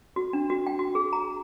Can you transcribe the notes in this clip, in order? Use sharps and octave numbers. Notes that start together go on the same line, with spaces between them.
F#4
D4
F#4
G5
F#4
G#4
A#5